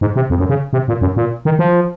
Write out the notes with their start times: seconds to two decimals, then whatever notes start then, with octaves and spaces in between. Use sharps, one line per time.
0.01 G#2
0.16 C3
0.30 F2
0.39 F#2
0.49 C#3
0.73 C3
0.88 A#2
1.01 F#2
1.16 A#2
1.45 D#3
1.59 F3